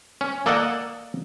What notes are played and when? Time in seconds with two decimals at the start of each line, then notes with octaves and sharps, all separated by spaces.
0.21 C#4
0.46 A#3 A4 D5 D#5 F#5 A5